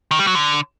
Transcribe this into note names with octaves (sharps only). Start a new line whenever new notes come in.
D#3
G3
F#3
D3